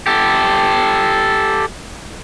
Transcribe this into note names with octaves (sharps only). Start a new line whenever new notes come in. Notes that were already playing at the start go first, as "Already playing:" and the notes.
G4 A4